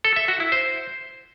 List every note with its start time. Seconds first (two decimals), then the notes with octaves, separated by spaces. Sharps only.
0.04 A4
0.16 E5
0.28 F#4
0.40 E4
0.52 C5